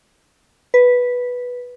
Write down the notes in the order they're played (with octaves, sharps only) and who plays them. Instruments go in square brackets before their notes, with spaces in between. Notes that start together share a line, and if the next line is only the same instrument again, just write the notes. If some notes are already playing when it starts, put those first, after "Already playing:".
[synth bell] B4